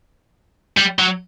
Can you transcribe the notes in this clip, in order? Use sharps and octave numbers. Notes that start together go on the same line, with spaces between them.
G3
F#3